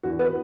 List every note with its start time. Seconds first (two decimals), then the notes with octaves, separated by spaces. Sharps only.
0.03 E2 F#4
0.19 B3 B4